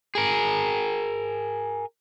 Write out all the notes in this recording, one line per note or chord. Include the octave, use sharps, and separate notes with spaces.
G#4 A#4